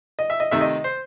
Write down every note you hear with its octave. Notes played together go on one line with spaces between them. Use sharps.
D#5
E5
D#5
C3 D#3 A3 E5
D#5
C5